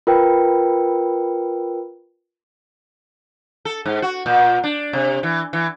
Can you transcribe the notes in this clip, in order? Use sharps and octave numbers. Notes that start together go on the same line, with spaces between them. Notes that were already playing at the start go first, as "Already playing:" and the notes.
F4 A#4 B4 G5
A4
G#2
F#4
A#2
D4
C3
E3
E3